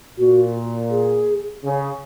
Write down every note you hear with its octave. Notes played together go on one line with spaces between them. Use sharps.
A#2 F#4
G#4
C#3